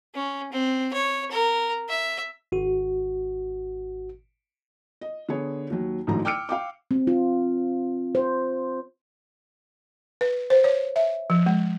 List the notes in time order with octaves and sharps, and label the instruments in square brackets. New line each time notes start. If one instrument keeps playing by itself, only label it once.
[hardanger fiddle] C#4
C4
C#5
A#4
E5
[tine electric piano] G#1 F#4
[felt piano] D#5
D3 B3 G#4 C#5
D#2 F#3
A1 G#2 D3 E3 F#3 A#5
G5 D6 E6 F6 C#7 D7
F5 G5 D6
[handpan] C4
F4
C5
[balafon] B4
C5
C#5
E5
F3
G#3